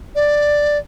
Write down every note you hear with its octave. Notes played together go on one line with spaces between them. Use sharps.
D5